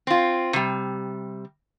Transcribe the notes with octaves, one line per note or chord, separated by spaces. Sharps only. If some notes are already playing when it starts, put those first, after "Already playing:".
C4 F4
C3 G3